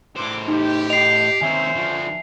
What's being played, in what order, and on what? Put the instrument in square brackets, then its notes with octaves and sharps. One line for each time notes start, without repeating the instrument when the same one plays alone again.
[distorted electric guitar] A2 C5 [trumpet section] D4 E4 D6
[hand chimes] D#4 [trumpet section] G4
[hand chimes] D#5 [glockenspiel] C7 F7
[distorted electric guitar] D#2 C4 [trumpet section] C#4 C5 [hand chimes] E5 G#5
[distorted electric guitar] D3 F3